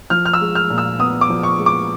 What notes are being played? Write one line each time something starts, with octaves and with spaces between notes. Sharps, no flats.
F3 F6
F6
E6
G#3
F6
A#2
E6
B3 D#6
D6
F3
C#6
G#3
D6